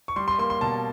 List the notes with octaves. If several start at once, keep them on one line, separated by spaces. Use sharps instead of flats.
C#6
G3 C6
C6
A#3 C6
C6
B2 A5